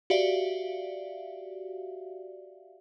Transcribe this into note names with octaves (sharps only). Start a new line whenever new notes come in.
F#4 G4 D5 E5 F5